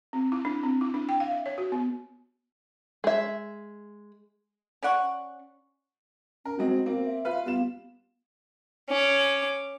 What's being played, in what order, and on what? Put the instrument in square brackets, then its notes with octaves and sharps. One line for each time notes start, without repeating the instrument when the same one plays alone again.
[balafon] C4
E4
D4
C4
E4
D4
G5
F5
E5
C#5
F#4
B3
[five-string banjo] G#3 E5
[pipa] C#4 D5 F#5 C#6
[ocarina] C#4 [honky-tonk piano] A#4
[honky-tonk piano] F#3 G#3 C4 [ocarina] F#4
[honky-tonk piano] A#3 C4
[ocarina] E5
[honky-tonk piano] F4 B4 F5
[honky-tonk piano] G3 F4 E7 [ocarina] B3
[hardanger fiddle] C#4 D6